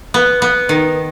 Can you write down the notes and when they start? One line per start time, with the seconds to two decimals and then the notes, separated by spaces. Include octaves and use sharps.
0.14 B3
0.42 B3
0.69 D#3